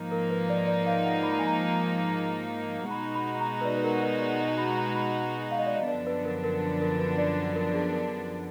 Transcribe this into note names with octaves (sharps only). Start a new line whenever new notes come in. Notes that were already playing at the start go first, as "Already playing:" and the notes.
Already playing: G#2 F3 A#3 D#4
A#4
B4
D5
D5
F5
F#5
B5
A#5
G#5
A#5
B2 G#3 D#4 F#4 B5
B5
A#5
B4
D5
B4
A#4
B4
D5
D#5
B5
A#5
B5
F5
D#5
D5
D#5
F#2 D3 F3 B3 D4 D5
B4
A#4
A#4
A#4
B4
D5
A#4
G#4
A#4